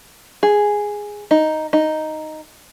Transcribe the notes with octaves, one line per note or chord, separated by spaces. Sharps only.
G#4
D#4
D#4